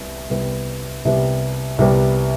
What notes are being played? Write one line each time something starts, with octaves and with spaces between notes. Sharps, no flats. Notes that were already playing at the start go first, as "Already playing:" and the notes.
Already playing: C2 C3 G3 B3
C2 C3 G3 B3
C2 C3 G3 B3
C2 C3 G3 B3